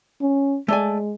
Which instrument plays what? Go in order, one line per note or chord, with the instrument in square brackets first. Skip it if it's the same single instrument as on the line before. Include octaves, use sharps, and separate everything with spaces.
[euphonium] C#4
[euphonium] G#3 [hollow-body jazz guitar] A3 D5 G#5